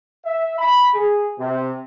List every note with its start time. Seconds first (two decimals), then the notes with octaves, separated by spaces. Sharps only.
0.25 E5
0.59 B5
0.95 G#4
1.39 C3